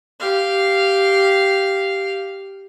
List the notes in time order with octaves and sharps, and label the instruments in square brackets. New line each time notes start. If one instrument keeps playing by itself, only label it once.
[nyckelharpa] G4 F5